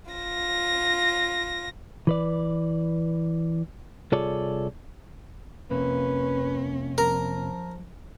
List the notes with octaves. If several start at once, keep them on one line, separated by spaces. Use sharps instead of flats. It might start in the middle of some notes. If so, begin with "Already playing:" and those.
F4 A#6
E3 B4 D5
C2 F4 G#4 A4 C#5 D5
F2 C3 A#3 C#4 B4
F3 A#4